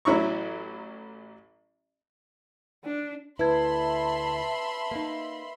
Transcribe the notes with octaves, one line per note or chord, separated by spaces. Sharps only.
A1 F#3 E4 A#5 C#6
D4
D2 E4 B4 E5 A5 B5 C6 G#6
A#3 D#4